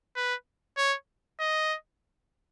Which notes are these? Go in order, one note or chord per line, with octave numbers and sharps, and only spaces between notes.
B4
C#5
D#5